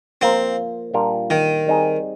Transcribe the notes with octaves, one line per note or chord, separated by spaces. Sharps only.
F3 A#3 C4 F4 A#4
A#2 G3 D4 F4 A#4
D#3
G3 C4 D#4 G#4